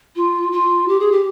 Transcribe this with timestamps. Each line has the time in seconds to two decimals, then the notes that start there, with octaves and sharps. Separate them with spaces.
0.15 F4
0.52 F4
0.87 G4
0.99 G#4
1.11 G4